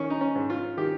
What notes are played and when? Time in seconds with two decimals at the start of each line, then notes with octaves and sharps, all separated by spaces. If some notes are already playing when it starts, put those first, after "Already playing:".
Already playing: D#3 C#4
0.10 D#4
0.21 C#4
0.35 G#2
0.50 F4
0.77 D#3 G4